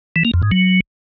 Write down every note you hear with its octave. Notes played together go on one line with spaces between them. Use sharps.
E3
A#3
F2
G#2
F#3